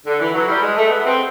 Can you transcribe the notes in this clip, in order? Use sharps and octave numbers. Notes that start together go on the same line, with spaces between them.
D3
E3
F#3
G3
G#3
A3
B3
C4